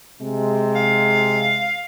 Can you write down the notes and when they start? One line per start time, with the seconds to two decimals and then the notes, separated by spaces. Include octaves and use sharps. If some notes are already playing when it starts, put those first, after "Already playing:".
0.21 C3 G#3
0.76 F5